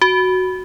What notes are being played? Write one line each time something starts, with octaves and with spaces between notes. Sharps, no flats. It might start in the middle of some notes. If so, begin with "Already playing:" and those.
F#4